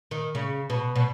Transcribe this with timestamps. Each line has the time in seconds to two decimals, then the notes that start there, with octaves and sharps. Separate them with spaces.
0.11 D#3
0.35 C#3
0.70 B2
0.95 B2